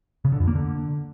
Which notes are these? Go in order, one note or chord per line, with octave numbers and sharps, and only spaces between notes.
C#3
D3
F2
A#3
D3